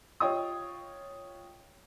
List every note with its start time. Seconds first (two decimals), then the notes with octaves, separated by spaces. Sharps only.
0.20 F4 C#5 D#5 G5 D#6